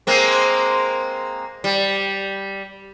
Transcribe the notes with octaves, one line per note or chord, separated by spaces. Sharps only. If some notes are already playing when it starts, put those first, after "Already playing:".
G#3 A#3 C4
G3